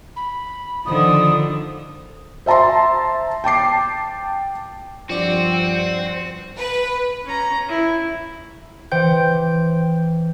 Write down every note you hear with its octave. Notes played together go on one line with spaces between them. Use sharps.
B5
D3 D#3 F3 D#6
C5 E5 A5 A#5 C6
G5 A5 D6 C7
G2 F3 C4 F#4 D5
B4
C#4 A#5
E4
E3 C5 G5 G6